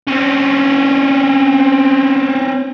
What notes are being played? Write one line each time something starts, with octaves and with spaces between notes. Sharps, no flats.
C4 C#4